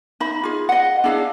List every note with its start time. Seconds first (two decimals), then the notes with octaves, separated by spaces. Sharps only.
0.20 D#4 E5 B5
0.43 F4 G#4
0.69 D#5 F#5
1.04 D4 E4 G#4 F5